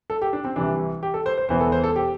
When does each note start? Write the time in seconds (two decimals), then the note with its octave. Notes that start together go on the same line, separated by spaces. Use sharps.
0.10 A4
0.22 G4
0.33 D4
0.45 C4
0.56 C2 C3 E3 D4
1.03 G4
1.14 A4
1.26 C5
1.38 C5
1.49 E1 E2 E3 C5
1.60 A4
1.72 C5
1.84 A4
1.96 G4